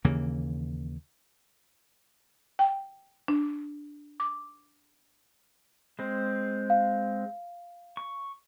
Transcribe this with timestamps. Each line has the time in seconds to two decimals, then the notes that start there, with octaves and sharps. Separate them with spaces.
0.04 D#2 C#3 E3 A#3
2.59 G5
3.28 D4
4.20 D6
5.99 G#3 C4
6.70 F5
7.97 C#6